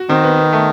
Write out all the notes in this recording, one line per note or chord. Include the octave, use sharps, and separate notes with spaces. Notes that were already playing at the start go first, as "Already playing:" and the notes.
Already playing: F#4
D#3 C4
B3
B3
A3